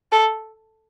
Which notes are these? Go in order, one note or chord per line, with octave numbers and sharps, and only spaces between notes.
A4